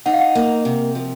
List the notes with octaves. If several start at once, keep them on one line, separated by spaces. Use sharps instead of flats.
D#4 F#5
F5
F#5
A#3
C3
F3